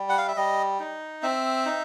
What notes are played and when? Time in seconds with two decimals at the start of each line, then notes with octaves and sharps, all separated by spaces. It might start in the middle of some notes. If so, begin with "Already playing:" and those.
Already playing: G3
0.09 F#5
0.18 F5
0.28 E5
0.37 G3 D#5
0.80 D#4
1.22 C4 E5
1.66 D#4